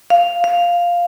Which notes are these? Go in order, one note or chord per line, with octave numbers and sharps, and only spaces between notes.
F5
F5